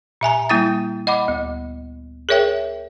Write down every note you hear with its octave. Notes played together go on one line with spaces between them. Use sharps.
A#2 E5 G#5 A#5
G3 A#3 E4 D#6 A6
D#5 F#5 B5 D6
D2
G#4 A#4 C#5 E5 G5